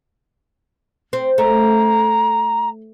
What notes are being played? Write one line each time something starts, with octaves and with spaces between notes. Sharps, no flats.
C4
A3 A#5